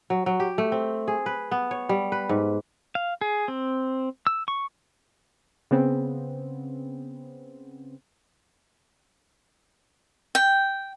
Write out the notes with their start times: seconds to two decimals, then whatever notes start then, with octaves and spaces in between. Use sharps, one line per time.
0.10 F#3
0.26 F#3
0.40 G4
0.58 A3
0.72 C4
1.08 G#4
1.26 B4
1.51 B3
1.71 C#5
1.89 G3
2.12 B4
2.29 G#2
2.95 F5
3.21 G#4
3.48 C4
4.27 E6
4.48 C#6
5.71 C#3 B3 C4
10.35 G5